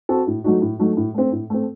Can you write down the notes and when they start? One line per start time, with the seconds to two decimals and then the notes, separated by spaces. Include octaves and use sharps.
0.09 C4 F#4 A4
0.27 A2
0.44 F#3 A3 D#4 F#4
0.62 A2
0.79 F#3 A3 D#4 F#4
0.97 A2
1.14 A3 C4
1.32 A2
1.50 A3 C4